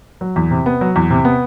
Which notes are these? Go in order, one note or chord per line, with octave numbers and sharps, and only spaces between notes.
F#3
E2
C3
B3
F#3
E2
C3
B3